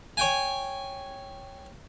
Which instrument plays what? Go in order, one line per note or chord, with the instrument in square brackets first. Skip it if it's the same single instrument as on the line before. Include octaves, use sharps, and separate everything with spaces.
[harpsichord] C#5 G5 G#5